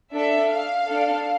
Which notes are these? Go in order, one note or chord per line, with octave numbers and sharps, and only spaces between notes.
D4 A4 E5
F5
D4 A4